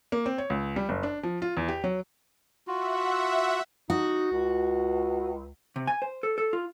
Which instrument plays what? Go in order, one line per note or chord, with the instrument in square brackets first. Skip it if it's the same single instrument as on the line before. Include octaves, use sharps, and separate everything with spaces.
[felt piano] A#3
C4
C#5
C#2
G3
F#1
D4
F3
F4
E2
G4
F#3
[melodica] F4 F#4 [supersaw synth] E5 F#5
[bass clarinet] D#4 [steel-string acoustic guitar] F#4
[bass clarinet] C#2
[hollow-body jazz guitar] C3
G#5
C5
A4
A4
F4